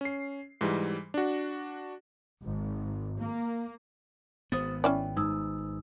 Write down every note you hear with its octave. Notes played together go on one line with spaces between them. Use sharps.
C#4 C7
G#2 E3 G3
D4 F#4
G#1
A#3
G#1 B3 C5 D#6 A6
C#4 E4 D5 G5
G#2 D#4 D#6 E6